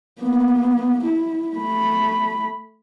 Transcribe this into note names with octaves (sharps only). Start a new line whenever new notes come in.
A#3 B3
E4
A3 B5